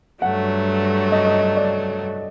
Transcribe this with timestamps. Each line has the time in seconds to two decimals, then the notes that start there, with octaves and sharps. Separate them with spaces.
0.22 G2 F#3 A3 F#5
1.12 D#5
1.27 D#5
1.57 D5